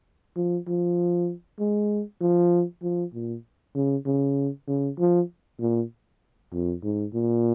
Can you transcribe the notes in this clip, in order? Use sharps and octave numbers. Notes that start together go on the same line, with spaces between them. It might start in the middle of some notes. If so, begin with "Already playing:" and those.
F3
F3
G#3
F3
F3
A#2
C#3
C#3
C#3
F3
A#2
F2
G#2
A#2